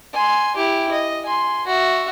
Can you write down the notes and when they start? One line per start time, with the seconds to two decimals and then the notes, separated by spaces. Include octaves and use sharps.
0.14 G#5 C6
0.56 E4 G4
0.91 D#5
1.26 G#5 C6
1.67 F#4 E5